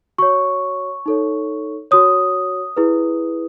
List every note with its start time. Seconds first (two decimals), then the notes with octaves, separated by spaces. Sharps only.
0.18 F#4 C#5 C#6
1.06 D#4 A4 C#5
1.91 F#4 C#5 D#6
2.77 E4 G#4 B4